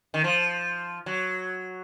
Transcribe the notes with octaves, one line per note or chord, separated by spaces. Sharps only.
D#3
F3
F#3